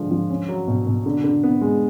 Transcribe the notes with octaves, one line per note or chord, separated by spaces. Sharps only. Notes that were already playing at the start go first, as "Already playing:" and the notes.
Already playing: D3 F3 G#3
F3
C#4
F#3
B2
B2
D3
D3
B3
G#3